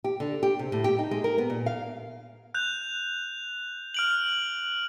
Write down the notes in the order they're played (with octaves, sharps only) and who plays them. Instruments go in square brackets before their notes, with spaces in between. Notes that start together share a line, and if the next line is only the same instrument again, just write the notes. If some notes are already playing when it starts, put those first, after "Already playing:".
[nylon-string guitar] G4
D3
G4
C3
A2
G4
D#4
G#3
A#4
B3
A#2
F5
[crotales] F#6 G6 F7
F6 D7 F#7